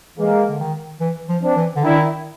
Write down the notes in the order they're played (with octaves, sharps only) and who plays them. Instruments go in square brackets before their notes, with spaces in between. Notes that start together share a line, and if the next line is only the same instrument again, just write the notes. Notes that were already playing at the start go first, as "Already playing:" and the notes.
[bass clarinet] E3 [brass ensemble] G#3 A#3
[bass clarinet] D3
D#3
E3
F3
[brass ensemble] C4 D4
[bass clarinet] E3
D3
[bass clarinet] D#3 [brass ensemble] D4 E4